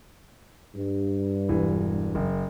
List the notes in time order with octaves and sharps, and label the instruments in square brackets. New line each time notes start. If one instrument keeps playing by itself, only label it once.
[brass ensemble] G2
[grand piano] E1 E3
F#1